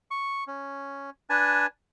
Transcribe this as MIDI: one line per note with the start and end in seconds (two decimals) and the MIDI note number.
0.11 0.44 85
0.47 1.10 61
1.30 1.66 62
1.30 1.66 71
1.30 1.66 80
1.30 1.66 81